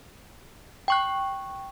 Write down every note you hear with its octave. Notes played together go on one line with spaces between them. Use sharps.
G5 C#6 F#6